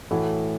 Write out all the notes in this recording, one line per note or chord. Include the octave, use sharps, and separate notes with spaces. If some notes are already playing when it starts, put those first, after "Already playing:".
A2 E3 A3 F#4 A4